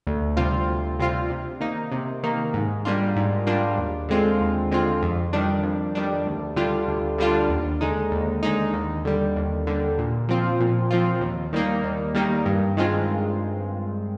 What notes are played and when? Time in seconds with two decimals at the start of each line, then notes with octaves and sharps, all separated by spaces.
0.07 D2
0.37 C3 G3 C4 F4
0.68 D2
0.99 C3 G3 C4 F4
1.30 C3
1.60 D#3 A#3 D#4
1.92 C3
2.23 D#3 A#3 D#4
2.54 G#2
2.85 G3 A#3 D4 F4
3.16 G#2
3.47 G3 A#3 D4 F4
3.78 D#2
4.08 D3 G#3 C4 F4
4.41 D#2
4.71 D3 G#3 C4 F4
5.02 F2
5.33 D#3 G3 D4
5.63 F2
5.95 D#3 G3 D4
6.26 D2
6.56 D3 G3 D4 F4
6.88 D2
7.18 D3 G3 D4 F4
7.49 D#2
7.81 D3 G#3 D#4
8.12 D#2
8.43 D3 G#3 D#4
8.74 D#2
9.05 D3 G3
9.36 D#2
9.67 D3 G3
9.98 A#2
10.29 F3 C4 F4
10.60 A#2
10.91 F3 C4 F4
11.21 D#2
11.53 D#3 G3 A#3 D#4
11.83 D#2
12.14 D#3 G3 A#3 D#4
12.46 G2
12.77 D#3 G#3 C4 F4